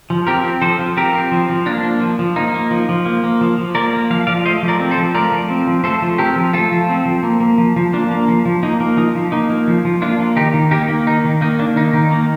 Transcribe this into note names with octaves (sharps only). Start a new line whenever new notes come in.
F3
C4 G4 A#4
C4
F3 A4 C5
F3
C4 G4 A#4
C4
F3
F3
A#3 D4
A#3
F3
F3
A#3 D#4
A#3
F3
F3
A#3
A#3
F3
F3
A#3 A#4 D5
A#3
F3 F5
F3 D5 F5
A3 C5 D#5
F3
A#4 D5
C4
A4 C5
F3
A3 A#4 D5
F3
C4
F3
A3 A4 C5
F3
C4 G4 A#4
F3
A3 F4 A4
F3
C4
F3
A#3
A#3
F3
F3
A#3 D4
A#3
F3
F3
A#3 D#4
A#3
F3 D#4
F3
A#3 D#4
A#3
F3
F3
A#3 D4 F4
A#3
D#3 D#4 G4
D#3
A#3 D#4 G4
A#3
D#3 D#4
D#3
A#3 D#4
A#3 D4
D#3 D#4
D#3 D#4
A#3